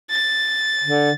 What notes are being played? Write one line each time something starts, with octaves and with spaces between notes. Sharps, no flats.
A6
D3